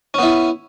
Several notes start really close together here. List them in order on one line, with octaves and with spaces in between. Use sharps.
C#4 B3 E4